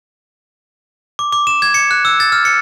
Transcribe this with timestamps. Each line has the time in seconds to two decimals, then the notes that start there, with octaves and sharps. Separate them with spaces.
1.19 D6
1.33 D6
1.47 E7
1.62 G#6
1.74 C#7
1.91 F#6
2.05 E6
2.20 A6
2.32 F6
2.45 C#7